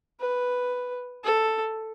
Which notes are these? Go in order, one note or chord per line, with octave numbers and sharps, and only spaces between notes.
B4
A4